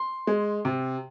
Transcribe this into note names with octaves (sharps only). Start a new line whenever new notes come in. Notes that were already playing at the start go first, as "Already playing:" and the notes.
Already playing: C6
G#3
C3